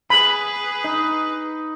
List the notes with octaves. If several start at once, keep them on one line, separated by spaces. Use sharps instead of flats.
G#4 B4 B5
D#4